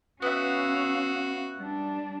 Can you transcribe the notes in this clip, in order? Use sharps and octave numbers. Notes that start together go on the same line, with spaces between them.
B3 C#4 F#4 E5 F5
G3 D4